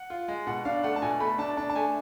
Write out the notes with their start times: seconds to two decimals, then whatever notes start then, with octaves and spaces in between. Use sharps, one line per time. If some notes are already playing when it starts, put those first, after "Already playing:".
Already playing: F#5
0.10 F4
0.28 G#3
0.47 B2 F#5
0.65 D4 F5
0.83 A3 F#5
0.96 A5
1.02 B2 G#5
1.20 A3 B5
1.38 D4 A5
1.57 D4 A5
1.70 A5
1.75 A3 G#5